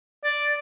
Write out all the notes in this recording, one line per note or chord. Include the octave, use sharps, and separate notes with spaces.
D5